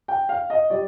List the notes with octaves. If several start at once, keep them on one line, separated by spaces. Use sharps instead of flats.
G5
F5
D#5
G3 D5